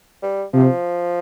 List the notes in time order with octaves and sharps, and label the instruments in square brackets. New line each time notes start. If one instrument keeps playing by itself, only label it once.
[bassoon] G3
[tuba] C3 [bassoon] F3